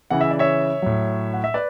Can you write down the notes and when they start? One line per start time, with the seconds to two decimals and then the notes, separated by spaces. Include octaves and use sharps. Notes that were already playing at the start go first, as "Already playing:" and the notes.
0.11 C#3 E3 F#5
0.21 E5
0.31 D5
0.39 C#5 E5
0.82 A2 F#3
1.34 F#5
1.44 E5
1.54 B4 D5